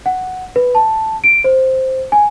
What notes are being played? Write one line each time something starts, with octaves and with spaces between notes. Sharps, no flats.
F#5
B4
A5
D7
C5
G#5